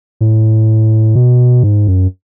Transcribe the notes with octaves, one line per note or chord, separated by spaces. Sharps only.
A2
B2
G#2
F#2